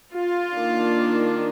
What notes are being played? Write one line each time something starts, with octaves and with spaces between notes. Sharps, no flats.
F4
D#3 A#3 D4